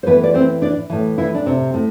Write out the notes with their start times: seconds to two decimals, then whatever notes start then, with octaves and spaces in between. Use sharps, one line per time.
0.03 C5
0.07 A2 E3 B3 B4
0.24 D5
0.34 C4 C5
0.62 D4 D5
0.90 A2 E3
1.18 E3 E4
1.35 D4
1.46 C3 C4
1.74 A2